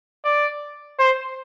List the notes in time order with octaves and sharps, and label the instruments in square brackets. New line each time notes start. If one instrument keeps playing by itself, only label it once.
[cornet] D5
C5